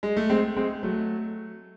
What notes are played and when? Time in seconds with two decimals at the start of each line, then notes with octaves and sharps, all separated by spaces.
0.03 G#3
0.17 A3
0.30 G#3 C4
0.57 G#3 C4
0.83 F#3 A3